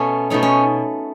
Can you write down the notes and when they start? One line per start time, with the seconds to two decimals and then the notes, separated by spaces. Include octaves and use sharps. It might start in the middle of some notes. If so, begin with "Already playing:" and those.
Already playing: B2 A3 B3 C#4
0.30 B2 A3 C#4 D#4
0.43 C#4